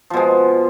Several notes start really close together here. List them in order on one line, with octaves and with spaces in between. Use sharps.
F3 B2 G#3